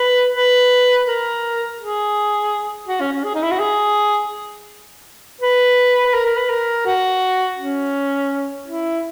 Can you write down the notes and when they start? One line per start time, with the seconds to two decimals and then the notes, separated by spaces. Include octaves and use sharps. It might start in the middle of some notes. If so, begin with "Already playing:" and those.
Already playing: B4
0.34 B4
1.06 A#4
1.80 G#4
2.87 F#4
3.00 C#4
3.12 C#4
3.24 G#4
3.35 D#4
3.42 E4
3.51 F#4
3.59 G#4
5.41 B4
6.06 B4
6.13 A#4
6.25 A#4
6.37 B4
6.49 A#4
6.86 F#4
7.58 C#4
8.67 E4